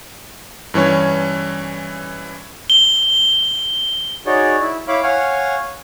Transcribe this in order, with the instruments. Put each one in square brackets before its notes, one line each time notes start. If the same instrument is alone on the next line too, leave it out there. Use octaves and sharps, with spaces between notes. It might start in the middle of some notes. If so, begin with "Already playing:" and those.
[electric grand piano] G2 E3 C#4 C#5
[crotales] G7
[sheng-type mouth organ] D#4 F#4 G#4 C#5 D5
E4
E4 C#5 F5 B5 D6
C#5 F5 F#5 G#5 F6